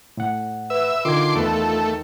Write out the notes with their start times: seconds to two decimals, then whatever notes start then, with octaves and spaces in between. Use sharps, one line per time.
0.17 A2 F#5
0.70 B4 E5
1.05 D3 D#3 F4 A4 C6 D6 G#6
1.36 E2 A3 B4